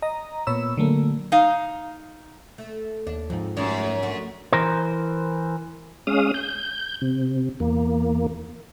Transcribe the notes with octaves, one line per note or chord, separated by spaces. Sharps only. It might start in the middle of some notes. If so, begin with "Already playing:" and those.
D#5 A#5
A#2 B3 C#5 B5 E6
D3 F#3 A3 A#3
D#4 F5
A3
D#2 D4
F2 G#2 F3
F#2 G3 A3
A3 D4 F#4
E3 A#4 C5
G#3 C#4 F5 D#6
G6
C3
E2 A#3